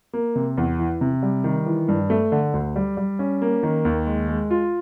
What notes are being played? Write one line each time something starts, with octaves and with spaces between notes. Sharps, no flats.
A#3
C3
E2
E3
C3
G3
D#3
E3
G2
A3
D3
D2
G3
G3
C#4
A#3
D#3
D#2
G#3
G#3
F4